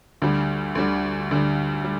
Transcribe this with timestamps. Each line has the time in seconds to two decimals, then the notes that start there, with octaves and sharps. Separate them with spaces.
0.22 D2 D3 G3
0.75 D2 D3 G3
1.31 D2 D3 G3
1.84 G3